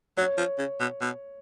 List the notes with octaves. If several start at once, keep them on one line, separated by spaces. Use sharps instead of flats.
F#3 C#5
F3
C#3
B2
B2